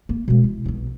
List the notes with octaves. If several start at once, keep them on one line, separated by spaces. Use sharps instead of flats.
A#3
B2 G#3
E4
B1 B2